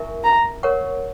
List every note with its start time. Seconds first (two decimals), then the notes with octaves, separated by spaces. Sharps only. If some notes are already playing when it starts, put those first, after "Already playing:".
Already playing: E4 A#4 E5 G#5 C#6
0.24 A#5
0.63 A#4 C#5 F#5 C#6